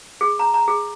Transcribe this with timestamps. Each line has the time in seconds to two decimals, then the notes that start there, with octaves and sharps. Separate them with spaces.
0.21 G#4
0.39 A#5
0.54 A#5
0.68 G#4